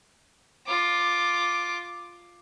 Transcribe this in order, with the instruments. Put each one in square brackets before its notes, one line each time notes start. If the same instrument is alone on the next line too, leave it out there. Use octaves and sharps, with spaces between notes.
[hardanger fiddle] F4 D6